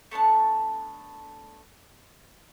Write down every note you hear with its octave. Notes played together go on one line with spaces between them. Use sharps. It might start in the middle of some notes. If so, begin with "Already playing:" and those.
A3 B3 D4 A5